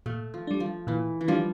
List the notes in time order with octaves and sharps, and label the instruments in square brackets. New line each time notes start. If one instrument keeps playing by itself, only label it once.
[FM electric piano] A#2 [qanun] A3
[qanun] F3
[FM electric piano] G3 D4
[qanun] F3
[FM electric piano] A#2 [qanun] E3
[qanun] E3
[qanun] F3 [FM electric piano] G3 D4